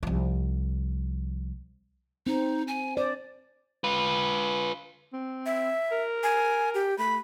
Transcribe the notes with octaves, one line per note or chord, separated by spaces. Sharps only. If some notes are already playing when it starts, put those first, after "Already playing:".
C2 F3
C4 D#4
G#5
C5 D5
F4 B4
C4
E5
A#4
G#5
G4
A3 B5